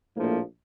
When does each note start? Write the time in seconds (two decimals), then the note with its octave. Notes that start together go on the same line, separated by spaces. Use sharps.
0.15 A#1 A2 F3 A#3